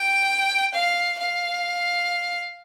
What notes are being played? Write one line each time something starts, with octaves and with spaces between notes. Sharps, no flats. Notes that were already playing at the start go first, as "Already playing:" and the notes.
Already playing: G5
F5
F5